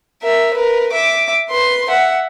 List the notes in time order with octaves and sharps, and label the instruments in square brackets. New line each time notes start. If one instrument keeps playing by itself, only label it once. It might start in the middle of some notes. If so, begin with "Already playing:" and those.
[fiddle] A#4 E5
A#4 B4
E5 D6
B4 C6
E5 F#5